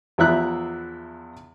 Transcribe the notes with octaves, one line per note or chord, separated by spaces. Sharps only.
E2 F3 E4 E5 A#5 F#6